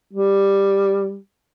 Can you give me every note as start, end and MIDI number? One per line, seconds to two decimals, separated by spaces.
0.13 1.17 55